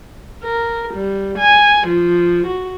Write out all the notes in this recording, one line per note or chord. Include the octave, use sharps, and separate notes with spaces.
A#4
G3
G#5
F3
F#4